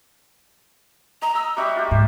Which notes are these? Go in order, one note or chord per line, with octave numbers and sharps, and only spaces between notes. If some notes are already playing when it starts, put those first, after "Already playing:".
D#5 A#5
A#5 E6
G3 C4 F#4 E5
F4 G4
G#2 C5